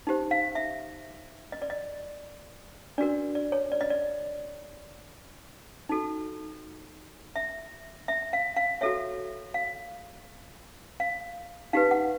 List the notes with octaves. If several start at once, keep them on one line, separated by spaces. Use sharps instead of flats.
D#4 G4 C5
F5
E5
D#5
D5
D#5
D4 F#4 A#4 D5
D5
C#5
D5
D#5
D5
D#4 F#4 A4
E5
E5
F5
F5
F#4 A4 C#5 E5
F5
F5
D#4 G4 B4 F5
F#5